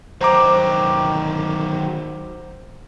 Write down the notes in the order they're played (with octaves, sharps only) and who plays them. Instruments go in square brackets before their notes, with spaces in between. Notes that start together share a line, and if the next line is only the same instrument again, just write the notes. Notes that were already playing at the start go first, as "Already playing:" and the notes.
[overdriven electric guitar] D#3 F#3 [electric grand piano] C5 A#5 D6